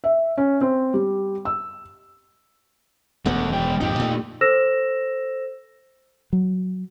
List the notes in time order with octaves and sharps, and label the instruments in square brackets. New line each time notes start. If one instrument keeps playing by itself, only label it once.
[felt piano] E5
C#4
C4
G3
E6
[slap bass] E1 F#2 B3 [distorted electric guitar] A3 F#5
[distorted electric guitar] G#3 G5
[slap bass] G#1 F2 A#2 [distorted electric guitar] D#4 G4
[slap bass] A#2 A3
[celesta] A4 C5 E6 A#6 E7
[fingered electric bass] F#3